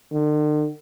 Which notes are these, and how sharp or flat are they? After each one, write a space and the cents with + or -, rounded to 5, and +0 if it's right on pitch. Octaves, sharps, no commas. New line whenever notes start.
D3 +45